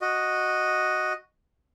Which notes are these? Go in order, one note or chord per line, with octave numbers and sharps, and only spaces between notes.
F#4 D#5